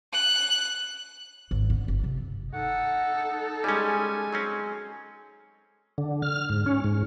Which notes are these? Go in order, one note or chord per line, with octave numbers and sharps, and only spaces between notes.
F#6
G#1
D3
G1
C3
D#4 A4 F#5
G3 G#3 C#4 D#5 G#5
F#3 C4 C#4
D3
F6
G#2
C#4
G#2